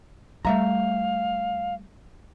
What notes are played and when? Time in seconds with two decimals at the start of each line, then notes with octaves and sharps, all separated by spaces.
0.45 G3 A3 E5 F5 A#5